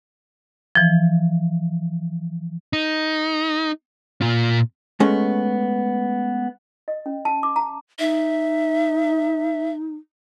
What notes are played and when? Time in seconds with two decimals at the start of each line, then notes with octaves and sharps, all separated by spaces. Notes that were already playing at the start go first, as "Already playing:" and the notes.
0.75 E3 F3
2.73 D#4
4.22 A#2 F4
5.00 G#3 A3 B3 C#4
6.88 D#5
7.06 C#4
7.25 A5
7.43 D6
7.56 A#5
7.99 D#4 E5